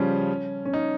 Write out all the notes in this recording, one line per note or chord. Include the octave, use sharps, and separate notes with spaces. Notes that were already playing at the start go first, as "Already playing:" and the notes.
Already playing: C#3 F3 G3 C#4
C#4
D#4